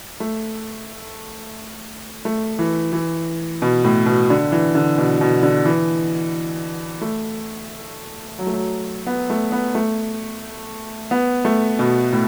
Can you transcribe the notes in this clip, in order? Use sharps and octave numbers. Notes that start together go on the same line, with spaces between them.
A3
A3
E3
E3
B2
A2
B2
D3
E3
D3
B2
B2
D3
E3
A3
F#3
A3
F#3
B3
A3
B3
A3
B3
A3
B2
A2